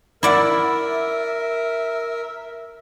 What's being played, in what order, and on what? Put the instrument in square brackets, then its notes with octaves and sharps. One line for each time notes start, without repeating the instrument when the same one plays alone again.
[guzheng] E4 D5 F#5 [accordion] A#4 [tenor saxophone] E5